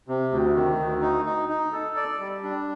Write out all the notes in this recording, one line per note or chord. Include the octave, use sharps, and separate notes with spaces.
C3
D2
D#3
D2
D#4
D#4
D#4
A4
D5
G3
D4